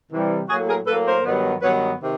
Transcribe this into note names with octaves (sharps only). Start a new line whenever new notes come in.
C3 E3 G3
A2 F#3 A#3 F#4 G#4
G#4 A#4
A2 F#3 A#3 A4 B4
A#4 C5
G2 D#3 F#3 B3
G2 D#3 F#3 B3 B4 C#5
C3 D#3